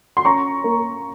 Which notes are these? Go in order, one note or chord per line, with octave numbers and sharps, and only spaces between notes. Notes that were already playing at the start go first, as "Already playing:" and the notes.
C6
C#4 A#5 C#6
A#3